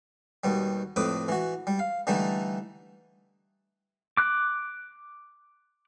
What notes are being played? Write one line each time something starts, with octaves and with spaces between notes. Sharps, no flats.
D#2 B2 G3
F2 A2 B4 D6 D#6
E3 F#4
G3
F5
D3 E3 G3 A3 D#4
D6 F#6